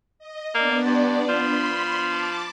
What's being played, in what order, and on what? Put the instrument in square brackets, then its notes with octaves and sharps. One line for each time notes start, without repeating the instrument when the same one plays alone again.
[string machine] D#5
[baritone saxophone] A#3 [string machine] B3 D4 D5
[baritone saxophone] G2
[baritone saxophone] F3 [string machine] B5 C6
[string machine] A5 D6